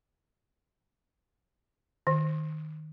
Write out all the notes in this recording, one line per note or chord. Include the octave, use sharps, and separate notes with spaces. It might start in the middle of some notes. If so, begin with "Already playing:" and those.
D#3